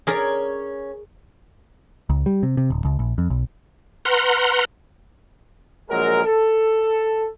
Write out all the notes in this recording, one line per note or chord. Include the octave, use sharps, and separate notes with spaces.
C#4 G#4 A#4 C#5 D5
C#2
G3
C3
C3
D1
C#2
A#1
F2
B1
B4 F#5 A#5 C6 F6
A#1 F#3 G#3 G#4 A#4
A4